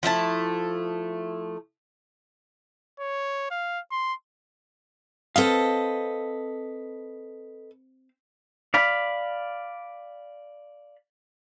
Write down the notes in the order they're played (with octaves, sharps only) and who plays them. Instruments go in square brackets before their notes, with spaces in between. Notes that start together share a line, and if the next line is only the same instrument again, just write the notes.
[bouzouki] F3 A3 E4 A5
[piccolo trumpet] C#5
F5
C6
[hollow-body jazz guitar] C4 F5 [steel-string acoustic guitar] A4 B4 D#5
[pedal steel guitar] D5 F5 B5